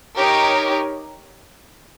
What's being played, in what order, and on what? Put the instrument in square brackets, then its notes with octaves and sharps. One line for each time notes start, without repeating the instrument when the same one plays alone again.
[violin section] D#4 G4 A#4 C#5